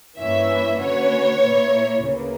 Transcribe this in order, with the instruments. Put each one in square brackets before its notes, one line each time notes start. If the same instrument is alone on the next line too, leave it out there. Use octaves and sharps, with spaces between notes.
[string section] G2 E3 A#3 C#4 E4 [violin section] E5
[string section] D3 A#3 C#4 F#4 B4 [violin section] C#5
[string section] A#2 A#3 E4
D2 C#3 E3 A#3